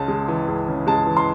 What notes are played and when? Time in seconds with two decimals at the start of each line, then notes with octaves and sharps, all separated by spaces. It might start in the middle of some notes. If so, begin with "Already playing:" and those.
Already playing: C#2 C#3 A5
0.08 G#3
0.28 E3
0.48 C#2
0.68 C#3
0.87 G#3 A5
1.06 E3
1.17 C6